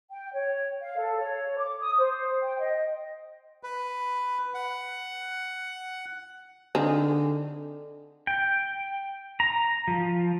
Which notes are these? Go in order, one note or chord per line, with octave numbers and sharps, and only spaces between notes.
G5
C#5
F5
A4
C#5
D6
D#6
C5
G5
D#5
B4
F#5
D3 D#3 C4 G#4
G5
A#5
F3